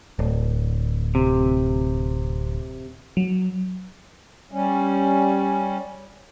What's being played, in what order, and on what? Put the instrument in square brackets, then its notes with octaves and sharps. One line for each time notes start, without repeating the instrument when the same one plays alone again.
[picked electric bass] D1
[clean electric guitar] C3
[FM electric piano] F#3
[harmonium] G3 C#4